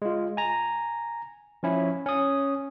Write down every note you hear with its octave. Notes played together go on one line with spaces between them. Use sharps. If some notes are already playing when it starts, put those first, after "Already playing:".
G#3 F4
G#5 A#5
F3 C#4 E4
C#4 D#6